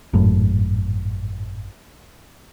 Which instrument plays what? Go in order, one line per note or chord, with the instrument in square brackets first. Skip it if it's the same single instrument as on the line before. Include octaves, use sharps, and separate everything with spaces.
[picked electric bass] G#1 F#2 A2